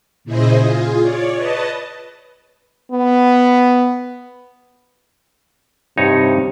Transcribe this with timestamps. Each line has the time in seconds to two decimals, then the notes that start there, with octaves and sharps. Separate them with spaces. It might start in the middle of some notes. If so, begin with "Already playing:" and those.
0.24 A#2 C#3 E4 G#4 C5 D#5
0.57 F4 G#4
1.01 C#5 D5
1.36 B4 D#5 A5
2.92 B3
5.98 G2 C3 D#4 C#5